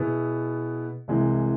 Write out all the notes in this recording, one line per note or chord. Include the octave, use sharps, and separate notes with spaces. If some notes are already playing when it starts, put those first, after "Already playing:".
Already playing: B2 B3 E4 G#4
C2 C3 E3 G#3